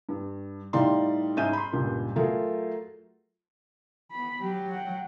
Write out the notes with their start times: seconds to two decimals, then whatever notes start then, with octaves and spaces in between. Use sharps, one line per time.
0.09 G2
0.73 A2 G3 D#4 D5 F5 C6
1.37 G#2 C#4 G#4 E5 G6 D#7
1.53 B5 C6
1.73 C#2 G2 A#2
2.16 F#3 A3 F4 G#4 A#4
4.11 B3 B5
4.41 F#3 G4
4.70 F#5 G5